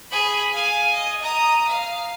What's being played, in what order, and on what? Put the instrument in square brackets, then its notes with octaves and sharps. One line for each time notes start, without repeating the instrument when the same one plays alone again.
[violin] G#4 B5
F5 G#5
D#5
A#5 D#6
F5